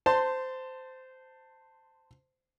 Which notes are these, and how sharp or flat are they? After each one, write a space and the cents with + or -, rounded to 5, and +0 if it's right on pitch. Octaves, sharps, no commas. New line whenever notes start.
C5 -15 A5 +15 C6 +0